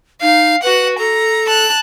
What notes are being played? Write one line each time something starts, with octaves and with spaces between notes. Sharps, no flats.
D#4 F5
F#4 B4 F#5
A4 A#5
A5 F#6